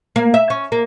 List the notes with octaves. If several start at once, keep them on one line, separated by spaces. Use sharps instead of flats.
A#3
E5
C#4
A#3